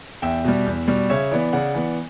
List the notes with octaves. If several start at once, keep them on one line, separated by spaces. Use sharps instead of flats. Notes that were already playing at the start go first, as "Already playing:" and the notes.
E2 E5 G5
B2 G3
E2
B2 G3
C#3 C#5 E5
E3 B3 D5
C#3 D5 F#5
E3 B3